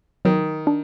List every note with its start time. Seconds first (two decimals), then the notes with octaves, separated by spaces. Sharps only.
0.25 D#3 F#3
0.67 D4